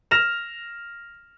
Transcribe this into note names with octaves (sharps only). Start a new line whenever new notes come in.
F6 A#6 E7 F7